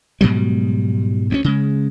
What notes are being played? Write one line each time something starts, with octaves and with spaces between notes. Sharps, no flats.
G#2 B2 F#3 G3
D2 B3 C#4
C#3 G#3